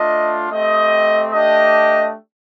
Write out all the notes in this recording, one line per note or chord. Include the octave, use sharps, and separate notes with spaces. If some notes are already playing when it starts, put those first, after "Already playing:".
Already playing: A3 D4 F4 D#5
A3 C4 G4 D#5
A3 D4 G4 D#5